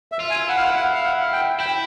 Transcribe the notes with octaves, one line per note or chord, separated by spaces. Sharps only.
E5
F4
G#5
E4 F#5
F5
F#5
F#5
F5
F#5
G5
E4 G5